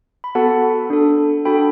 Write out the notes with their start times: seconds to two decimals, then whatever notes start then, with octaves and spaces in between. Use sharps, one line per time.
0.24 B5
0.35 B3 F#4 A4 F#5 A5
0.90 D4 A4
1.45 D4 F#4 A4 G5 B5